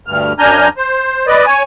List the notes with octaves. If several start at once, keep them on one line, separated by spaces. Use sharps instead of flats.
D2 G2 F6
F#2 D4 G#5 A#5 F6 G6
C5
B4 D5 D#5
C#5 G#5